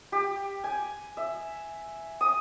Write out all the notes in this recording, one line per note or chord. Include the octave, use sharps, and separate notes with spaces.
G4
G#5
E5
D#6